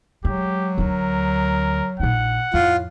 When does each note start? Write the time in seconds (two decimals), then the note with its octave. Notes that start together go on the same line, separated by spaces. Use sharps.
0.25 F#3 G#3 G4
0.78 D2 D4 A#4
2.00 A#1 D#4 F#5
2.54 F2 A2 F4